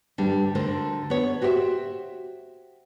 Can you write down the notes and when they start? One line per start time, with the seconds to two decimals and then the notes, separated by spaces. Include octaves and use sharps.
0.18 D2 G2 G3 D4
0.55 D2 D3 A3 A#4 C5
1.10 B3 C#5
1.41 F#4 G4 C5 C#5 E5